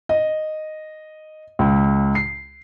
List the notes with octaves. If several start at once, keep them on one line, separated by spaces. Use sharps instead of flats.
D#5
C#2
C7